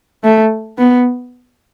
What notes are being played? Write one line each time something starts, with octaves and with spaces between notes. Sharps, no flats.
A3
B3